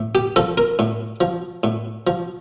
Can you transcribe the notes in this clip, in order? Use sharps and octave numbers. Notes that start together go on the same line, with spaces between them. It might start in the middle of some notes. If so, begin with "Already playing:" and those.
Already playing: A2
G4
F3 A4
A#4
A2
F3
A2
F3